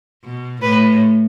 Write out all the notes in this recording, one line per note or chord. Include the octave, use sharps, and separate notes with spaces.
B2
A2 B4